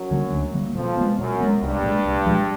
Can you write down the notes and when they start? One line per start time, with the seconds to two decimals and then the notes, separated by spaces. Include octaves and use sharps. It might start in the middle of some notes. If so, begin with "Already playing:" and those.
Already playing: F#2 F#3
0.11 D3 G3 A#3
0.32 D2
0.54 D3 G3 A#3
0.75 F2 B2 F3
0.97 G#3 B3
1.18 F#2 B2 F#3
1.40 G#3 B3
1.62 C2 G2 G3
1.83 A#2 F3 G#3
2.05 C2
2.26 A#2 F3 G#3